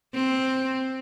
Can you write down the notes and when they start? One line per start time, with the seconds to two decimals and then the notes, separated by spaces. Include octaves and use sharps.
0.14 C4